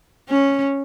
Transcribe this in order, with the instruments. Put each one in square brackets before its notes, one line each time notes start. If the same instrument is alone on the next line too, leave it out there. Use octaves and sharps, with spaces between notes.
[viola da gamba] C#4